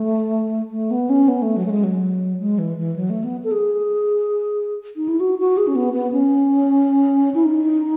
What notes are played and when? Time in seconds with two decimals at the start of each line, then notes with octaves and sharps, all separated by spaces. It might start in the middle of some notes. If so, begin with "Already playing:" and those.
Already playing: A3
0.72 A3
0.91 B3
1.10 C#4
1.28 B3
1.42 A3
1.57 F#3
1.66 A3
1.70 G#3
1.84 F#3
2.40 G#3
2.59 E3
2.78 E3
2.96 F#3
3.10 A3
3.24 B3
3.44 A4
3.51 G#4
4.96 D#4
5.08 E4
5.20 F#4
5.39 F#4
5.58 G#4
5.67 C#4
5.75 B3
5.94 B3
6.12 C#4
7.35 E4
7.44 D#4